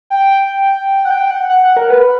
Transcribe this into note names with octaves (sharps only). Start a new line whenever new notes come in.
G5
F#5
G5
F#5
F#5
F#5
A#4
B4